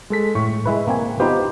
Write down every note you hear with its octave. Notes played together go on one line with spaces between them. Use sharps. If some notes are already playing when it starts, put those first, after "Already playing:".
G#3 A4 B6
A2 C#6
G#3 E4 B4
A#3 C4 G#5
B3 D#4 F4 G4 C5